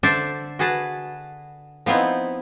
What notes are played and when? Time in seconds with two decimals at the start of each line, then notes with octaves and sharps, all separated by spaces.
0.03 D3 D4 A4 C5 D5 E5
0.59 F#4 G#4 B4 A5
1.86 F3 B3 C4 D#4 E4